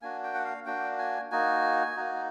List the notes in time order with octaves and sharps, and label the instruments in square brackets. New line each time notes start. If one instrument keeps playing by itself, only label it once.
[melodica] A#3 D4 F#4 G#5
G5
F#5
F5
A#3 D4 F#4 G5
G#5
A#3 D#4 F#4 G#5
A#3 D#4 F#4